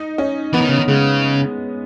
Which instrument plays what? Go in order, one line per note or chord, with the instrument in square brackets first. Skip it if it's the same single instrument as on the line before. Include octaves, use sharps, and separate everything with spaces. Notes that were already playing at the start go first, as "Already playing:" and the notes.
Already playing: [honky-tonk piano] D#4
C#4
[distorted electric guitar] E3 [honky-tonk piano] B3
[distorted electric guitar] D#3
C#3
D#3
[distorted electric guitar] C#3 [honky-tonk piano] G#3